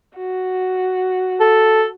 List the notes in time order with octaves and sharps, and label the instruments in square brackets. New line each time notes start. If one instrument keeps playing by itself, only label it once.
[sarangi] F#4
[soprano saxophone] A4